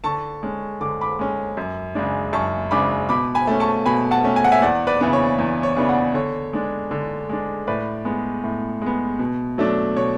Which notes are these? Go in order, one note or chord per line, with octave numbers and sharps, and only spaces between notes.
D3 A5 C#6
G#3 C#4
D3 D6
B5 D6
G#3 C#4
F#2
C#3 G#3 D4
F#2 A5 C#6
C#3 G#3 D4 B5 D6
B2 B5 D6
G#5 B5
A3 C#4
A5 C#6
B2 G#5 B5
F#5 A5
A3 C#4
G#5
F#5
E5 G#5
E2 D5 F#5
B4 D5
C#3 E3 B3 D4
C#5
E2
C#5
C#3 E3 B3 D4
D5 F#5
D3 C#5
G#3 D4
D3
G#3 D4
A2 B4 D5
G#3 B3
A2
G#3 B3
B2
F#3 A3 D4
B2 C#5